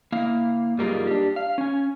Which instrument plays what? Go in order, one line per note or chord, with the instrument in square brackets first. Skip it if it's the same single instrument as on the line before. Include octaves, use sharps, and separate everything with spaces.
[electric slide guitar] A#3 E4 F5
F#2 G3 A#3 D#4 F4 G#4
D4 G4
F5
C#4 G#5